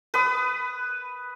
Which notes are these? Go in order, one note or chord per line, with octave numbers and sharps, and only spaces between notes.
B4 D#6